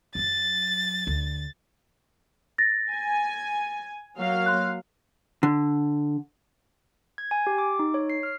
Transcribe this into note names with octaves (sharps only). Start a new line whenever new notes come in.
F#2 F#3 A6
D2
A6 A#6
G#5
F#3 A#3 F5
C6 F#6
D3
G#6
G#5
G4
D6
D#4
C#5
C7
F6